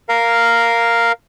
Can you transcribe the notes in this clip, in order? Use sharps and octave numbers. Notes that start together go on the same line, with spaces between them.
A#4 F5